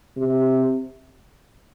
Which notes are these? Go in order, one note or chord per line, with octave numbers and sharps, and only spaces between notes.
C3